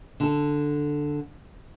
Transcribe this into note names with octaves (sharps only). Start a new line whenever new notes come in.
D3 A4